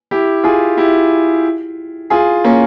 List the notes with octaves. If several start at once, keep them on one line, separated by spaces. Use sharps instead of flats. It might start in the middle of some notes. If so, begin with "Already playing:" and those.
E4 G4
F4 G#4
E4 G4
F4 G#4
A#3 C#4